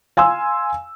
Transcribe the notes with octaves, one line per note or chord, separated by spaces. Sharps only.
F5 G#5 C6 E6